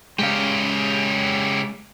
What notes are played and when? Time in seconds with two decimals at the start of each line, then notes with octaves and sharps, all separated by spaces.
0.19 C#3 G#3 G4 F5